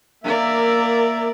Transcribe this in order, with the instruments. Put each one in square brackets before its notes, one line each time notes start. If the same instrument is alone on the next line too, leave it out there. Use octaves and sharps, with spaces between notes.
[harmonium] A#3 E5 [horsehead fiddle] A#4 D5